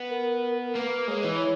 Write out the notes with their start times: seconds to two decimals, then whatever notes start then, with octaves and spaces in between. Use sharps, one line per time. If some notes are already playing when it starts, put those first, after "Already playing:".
Already playing: B3
0.10 A#4
0.75 A#3 B4
1.07 G#3 C#5
1.21 E3 B4
1.34 C#5